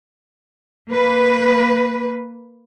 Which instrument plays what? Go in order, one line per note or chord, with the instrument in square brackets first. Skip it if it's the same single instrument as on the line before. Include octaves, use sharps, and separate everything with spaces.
[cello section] A#3 B4